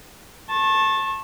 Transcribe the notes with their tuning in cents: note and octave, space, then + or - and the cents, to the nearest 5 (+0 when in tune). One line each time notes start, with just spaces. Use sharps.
A5 +0 C#6 -35